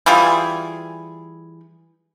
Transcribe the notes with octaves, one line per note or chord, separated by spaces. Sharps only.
E3 G3 F4 G#4